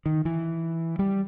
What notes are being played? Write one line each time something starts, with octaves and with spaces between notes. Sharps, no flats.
D#3
E3
G3